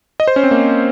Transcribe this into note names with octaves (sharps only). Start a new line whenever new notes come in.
D#5
C5
C#4
C4
A#3